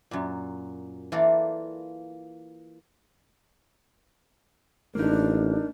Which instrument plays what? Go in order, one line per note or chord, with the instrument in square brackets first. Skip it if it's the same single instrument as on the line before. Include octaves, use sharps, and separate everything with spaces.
[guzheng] F#2 A#2
E3 A#3 F4 A4 A#4 D5
[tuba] A1 [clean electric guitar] A#3 D#4 [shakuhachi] D4